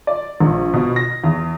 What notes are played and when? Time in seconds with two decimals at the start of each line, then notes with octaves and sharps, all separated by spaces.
0.07 D5
0.40 A#1
0.74 B2
0.96 A#6
1.24 E2